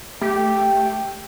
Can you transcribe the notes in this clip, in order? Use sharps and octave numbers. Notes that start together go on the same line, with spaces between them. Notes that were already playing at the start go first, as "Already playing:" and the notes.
A3 G4